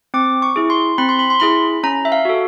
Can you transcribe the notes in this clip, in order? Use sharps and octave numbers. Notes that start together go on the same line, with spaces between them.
C4 D6
C#6
E4 G#4
C6
C4 B5
C6
B5
C6
E4 G#4 B5
C#4 A#5
E5
F5
F#4 A4